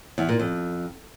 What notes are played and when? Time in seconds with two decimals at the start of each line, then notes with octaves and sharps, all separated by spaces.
0.18 E2
0.29 A#2
0.39 F2